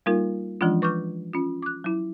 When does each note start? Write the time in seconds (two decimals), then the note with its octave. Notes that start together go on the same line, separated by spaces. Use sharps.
0.06 G3 A#3 D#4 F4 A#4
0.61 E3 F3 G#3 C#4 D4 F4
0.82 B4 C#6 D6 F6 G6
1.33 C#4 F4
1.62 D6 F#6
1.84 F#3 E4